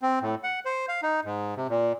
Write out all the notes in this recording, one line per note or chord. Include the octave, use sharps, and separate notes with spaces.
C4
A2
F#5
C5
F5
D#4
G#2
C3
A#2